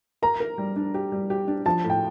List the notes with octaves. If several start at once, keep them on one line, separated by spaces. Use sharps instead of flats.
A#4 A#5
A#4
G3
D4
G4
G3
G4
D4
F3 A5
A2
G5